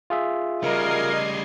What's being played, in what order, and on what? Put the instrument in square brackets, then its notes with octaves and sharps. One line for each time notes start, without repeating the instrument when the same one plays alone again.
[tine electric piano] F4 G#4 E5
[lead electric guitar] C#3 G3 [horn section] A#4 [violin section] D#5 G#6 C7